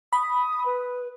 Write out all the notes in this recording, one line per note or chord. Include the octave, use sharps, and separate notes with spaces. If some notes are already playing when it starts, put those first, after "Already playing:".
B5 D#6
B4